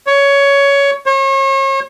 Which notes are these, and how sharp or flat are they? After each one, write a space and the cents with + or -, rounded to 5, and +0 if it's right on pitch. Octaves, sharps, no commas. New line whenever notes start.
C#5 +15
C#5 -40